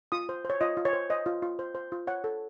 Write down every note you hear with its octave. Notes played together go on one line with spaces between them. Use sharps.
F4 D#6
C5
C5 C#5
F4 D#5
F4
C#5
C5
C5 D#5
F4
F4
C5
C5
F4
C#5 F#5
A4